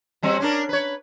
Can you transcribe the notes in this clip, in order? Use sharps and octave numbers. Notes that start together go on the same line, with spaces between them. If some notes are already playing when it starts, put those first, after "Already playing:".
F#3 G3 C4
C#4 D4 A#4
B4 C#5